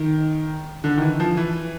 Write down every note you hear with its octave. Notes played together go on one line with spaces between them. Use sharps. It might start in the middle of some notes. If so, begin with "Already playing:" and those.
Already playing: D#3
D3
D#3
E3
F3
E3